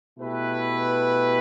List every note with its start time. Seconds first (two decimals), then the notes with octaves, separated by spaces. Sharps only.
0.18 B2 A3 E4 G4 B4